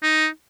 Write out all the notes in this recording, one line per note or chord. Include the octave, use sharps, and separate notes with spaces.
D#4